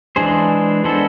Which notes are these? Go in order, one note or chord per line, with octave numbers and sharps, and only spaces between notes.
E3 G#3 D4 G#4 C5
G#3 B3 D4 A4 C5